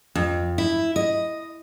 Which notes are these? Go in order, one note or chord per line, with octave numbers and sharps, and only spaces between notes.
F2
E4
D#5